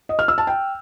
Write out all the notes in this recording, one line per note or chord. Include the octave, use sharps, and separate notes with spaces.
D#5
F6
E6
A5
G5